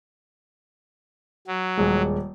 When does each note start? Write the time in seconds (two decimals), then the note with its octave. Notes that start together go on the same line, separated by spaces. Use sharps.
1.47 F#3
1.77 D#1 G#3